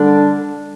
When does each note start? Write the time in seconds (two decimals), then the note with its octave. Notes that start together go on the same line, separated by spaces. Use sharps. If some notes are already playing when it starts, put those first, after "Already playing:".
Already playing: D3 G3 D4